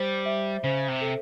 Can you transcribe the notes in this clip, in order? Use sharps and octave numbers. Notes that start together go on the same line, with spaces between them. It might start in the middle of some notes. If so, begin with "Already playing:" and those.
Already playing: G3 C5
E5
C#3 C5
C3
A4